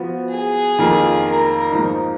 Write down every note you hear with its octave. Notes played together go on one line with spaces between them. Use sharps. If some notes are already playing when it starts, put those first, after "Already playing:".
Already playing: F3 B3 F#4
G#4
F2 D#3 A#3 F4
A#4
G#2 F3 A#3 D#4